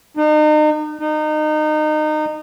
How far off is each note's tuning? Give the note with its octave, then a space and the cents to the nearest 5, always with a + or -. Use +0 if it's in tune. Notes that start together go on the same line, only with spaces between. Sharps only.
D#4 -35
D#4 -25